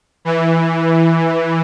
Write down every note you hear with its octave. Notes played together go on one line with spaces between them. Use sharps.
E3